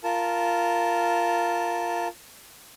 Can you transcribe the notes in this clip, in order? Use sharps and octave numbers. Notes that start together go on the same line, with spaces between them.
F4 A#4 A5